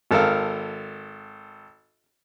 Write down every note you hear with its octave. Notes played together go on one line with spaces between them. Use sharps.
G#1 A4 A#4 F5